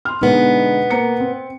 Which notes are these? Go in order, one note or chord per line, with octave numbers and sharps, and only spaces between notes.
C6 F6
B2 D3 G#3 B3 D#4
A#3 A#5 C#7
C4